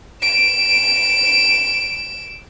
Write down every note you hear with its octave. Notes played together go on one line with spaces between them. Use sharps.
D7 E7